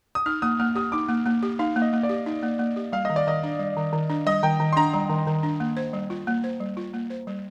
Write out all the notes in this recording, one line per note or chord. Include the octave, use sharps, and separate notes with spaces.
D#6
D#4 F6
A#3 D#6
A#3 F6
G4 D#6
D#4 D6
A#3
A#3
G4
D#4 F5
A#3
D#5
A#3
D5
G4
D#4
A#3
A#3
G4
G3 F5
D#3 D#5
D5
D#3 D#5
D4
G3
D#3
D#3
D4
G3 D#5
D#3 G5
D#3
C6
D4 A#5
G3 A#5
D#3
D#3
D4
A#3
C5
G3
F4
A#3
C5
G3
F4
A#3
C5
G3